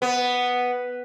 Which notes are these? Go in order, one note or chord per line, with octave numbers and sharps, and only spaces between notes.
B3